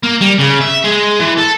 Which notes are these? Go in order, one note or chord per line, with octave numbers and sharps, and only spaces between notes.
A#3
G3
C#3
E5
G#3
E3
A4